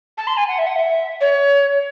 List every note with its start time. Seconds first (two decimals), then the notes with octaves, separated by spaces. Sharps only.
0.18 A5
0.27 C6
0.37 G#5
0.48 F#5
0.59 E5
0.67 F#5
0.76 E5
1.21 C#5